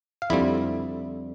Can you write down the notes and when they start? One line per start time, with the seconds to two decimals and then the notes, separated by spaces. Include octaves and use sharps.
0.22 F5
0.30 F2 D3 G3 C4 E4 E5